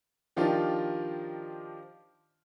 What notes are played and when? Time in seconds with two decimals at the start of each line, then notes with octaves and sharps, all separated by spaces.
0.36 D#3 F3 D4 D#4 F4 G4